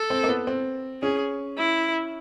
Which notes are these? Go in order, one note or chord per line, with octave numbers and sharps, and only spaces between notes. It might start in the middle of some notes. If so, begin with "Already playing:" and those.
Already playing: A4
C4
A#3
B3
C4
C#4 G#4
E4